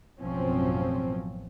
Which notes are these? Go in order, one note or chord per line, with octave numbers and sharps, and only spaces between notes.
A1 F#2 B2 F3 C4 C#4